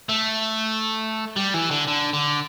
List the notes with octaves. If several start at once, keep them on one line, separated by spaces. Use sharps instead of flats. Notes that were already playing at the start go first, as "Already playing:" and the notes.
A3
G3
E3
D3
D3
D3